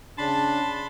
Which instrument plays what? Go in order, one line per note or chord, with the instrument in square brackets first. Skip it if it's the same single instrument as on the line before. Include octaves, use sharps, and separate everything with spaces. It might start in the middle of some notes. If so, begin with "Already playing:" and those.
[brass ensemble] C#3 [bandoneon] D4 [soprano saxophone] A5 [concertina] B5 C6